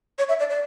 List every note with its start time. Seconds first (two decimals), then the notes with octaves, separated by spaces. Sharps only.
0.19 C#5
0.29 E5
0.40 D5
0.50 D5